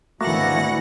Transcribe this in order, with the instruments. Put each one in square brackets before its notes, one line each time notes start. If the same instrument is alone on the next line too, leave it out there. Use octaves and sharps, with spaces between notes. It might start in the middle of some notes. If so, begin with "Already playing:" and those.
[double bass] G#1 E3 [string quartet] D2 F#5 A#6 [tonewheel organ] A3 A#3 F#4